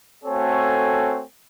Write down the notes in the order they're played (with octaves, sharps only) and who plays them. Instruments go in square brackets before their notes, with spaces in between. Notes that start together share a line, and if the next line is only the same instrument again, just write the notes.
[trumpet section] A3 C4 F#4 A4 C#5 G#5